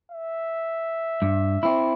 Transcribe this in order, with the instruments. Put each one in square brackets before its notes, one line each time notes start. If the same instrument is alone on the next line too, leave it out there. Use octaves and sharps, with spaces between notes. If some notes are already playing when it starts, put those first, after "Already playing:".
[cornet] E5
[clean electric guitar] G2
C4 E4